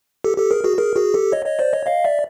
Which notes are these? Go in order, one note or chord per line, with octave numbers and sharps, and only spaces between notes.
G4 A4
G4 A4
G#4 A#4
F#4 G#4
G#4 A#4
F#4 G#4
G4 A4
C#5 D#5
C#5 D#5
C5 D5
C#5 D#5
D#5 F5
D5 E5